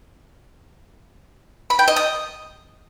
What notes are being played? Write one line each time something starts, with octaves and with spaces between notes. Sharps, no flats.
B5
G5
D#5
D#6